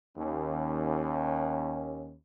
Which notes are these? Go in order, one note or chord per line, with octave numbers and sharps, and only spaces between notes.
D#2 C#4